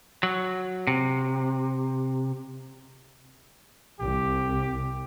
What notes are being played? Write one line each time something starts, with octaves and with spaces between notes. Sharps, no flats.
F#3
C3
C2 G4